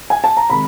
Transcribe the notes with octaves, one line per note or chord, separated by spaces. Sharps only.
G#5
A5
A#5
C3 D#3 G#3 B5